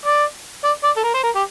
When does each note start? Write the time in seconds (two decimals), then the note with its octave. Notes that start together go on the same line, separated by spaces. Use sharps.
0.06 D5
0.64 D5
0.84 D5
0.97 A4
1.04 A#4
1.14 C5
1.23 A#4
1.35 G4